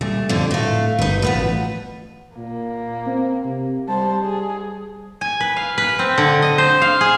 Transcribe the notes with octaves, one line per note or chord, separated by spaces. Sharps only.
A#2 G3 A3
F2 D3
A2 A3 F5
G1 D#4 B4
A1 F3 B3 B4
A#2 A#3
C4
C3
G3 C5 A5
G#4
G#5
B4
F5
B4
C4
D3
D#5
C5
F5
G#4